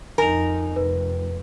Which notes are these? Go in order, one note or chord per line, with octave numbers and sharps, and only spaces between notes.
F2 D#4 A#4 G#5 F7
F1 B4